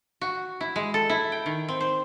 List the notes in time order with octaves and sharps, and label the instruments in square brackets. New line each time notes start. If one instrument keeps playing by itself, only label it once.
[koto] F#4
E4
G#3
A4
E4
G5
D#3
C4
C5